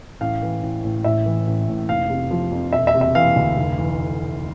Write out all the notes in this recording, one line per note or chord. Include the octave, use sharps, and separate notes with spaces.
A1 F5
E3
A1
A2
A1 E5
E3
A1
A2
F1 F5
C3
F3
F2
E1 E5
E5
C3
E5
E3 F5
D2
F1
E3